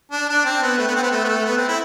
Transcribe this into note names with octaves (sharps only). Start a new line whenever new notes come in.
D4
D4
C4
B3
A3
B3
C4
B3
A3
B3
A3
B3
C4
E4